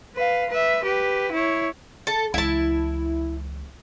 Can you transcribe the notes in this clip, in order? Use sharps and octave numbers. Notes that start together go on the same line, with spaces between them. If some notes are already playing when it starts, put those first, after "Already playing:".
B4 F5
B4 E5
G4 B4
E4 C#5
A4
C#2 E3 E4 A5